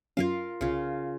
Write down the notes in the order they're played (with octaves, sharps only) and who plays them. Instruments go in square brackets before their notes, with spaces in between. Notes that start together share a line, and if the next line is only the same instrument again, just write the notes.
[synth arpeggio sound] F#2 F#3 C#4 [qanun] F4 A#4 F5
[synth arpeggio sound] C2 [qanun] C#3 F4